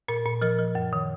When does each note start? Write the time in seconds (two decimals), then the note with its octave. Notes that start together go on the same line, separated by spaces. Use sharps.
0.08 A#2 A#4
0.25 A#2
0.42 F3 A#4
0.59 F3
0.75 F#2
0.93 D#3